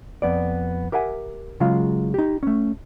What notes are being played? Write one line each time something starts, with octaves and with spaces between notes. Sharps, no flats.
F2 B3 D5
G4 A#4 E5 F#5 G#5
C#3 F#3 G#3 F4 F5
D#4 G4
A3 C#4